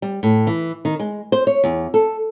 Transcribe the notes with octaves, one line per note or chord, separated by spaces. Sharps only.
G3
A2
E3
D#3
G#3
C5
C#5
E2
A4